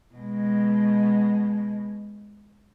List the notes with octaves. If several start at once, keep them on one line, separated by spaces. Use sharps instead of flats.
B2 G#3